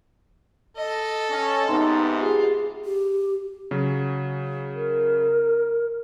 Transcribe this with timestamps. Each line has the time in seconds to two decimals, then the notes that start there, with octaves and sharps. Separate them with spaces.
0.77 A4 D#5
1.30 C#4
1.67 G#2 C3 B3 D#4 A#5 C6
2.21 F4 G4 G#4
2.85 G4
3.71 C#3 F#3
4.75 A#4